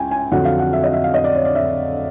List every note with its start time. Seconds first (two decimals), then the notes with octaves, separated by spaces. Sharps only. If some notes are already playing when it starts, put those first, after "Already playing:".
Already playing: C#2 G5 G#5
0.11 G#5
0.31 F2 D3 F#3 F#5
0.45 F5
0.59 F#5
0.73 E5
0.83 D#5
0.93 E5
1.04 F5
1.14 D#5
1.24 D5
1.35 C#5
1.45 D5
1.55 E5